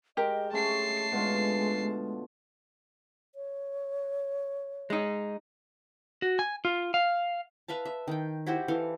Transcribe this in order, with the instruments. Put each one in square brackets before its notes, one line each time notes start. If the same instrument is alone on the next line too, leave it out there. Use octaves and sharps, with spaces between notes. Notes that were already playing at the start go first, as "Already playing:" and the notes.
[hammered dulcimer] G#3 [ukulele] G4 A#4 [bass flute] D#5
[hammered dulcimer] G#3 A3 C#4 [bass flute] G#4 [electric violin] A5 C7
[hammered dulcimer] B2 D3 F4 [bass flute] G#3
[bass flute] C#5
[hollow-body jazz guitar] G#3 D#4
[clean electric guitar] F#4
G#5
F4
F5
[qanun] B4 E5 F5 A5
E5
D#3 G5
E4 F#4 G4 C5
E3 A4 F5